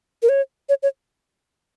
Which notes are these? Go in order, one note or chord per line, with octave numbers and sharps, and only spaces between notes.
A#4
C#5
C#5
C#5